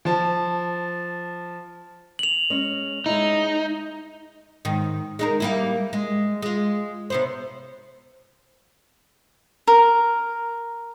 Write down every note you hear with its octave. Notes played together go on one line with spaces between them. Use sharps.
F3 A5
F7 F#7
G#3 C#4 D#5
G#3 D#4 E4
G#2 D#3
G#3 D#4 A#4
G3 A#3 E4
G#3
G#3 F4
C3 B3 C5
A#4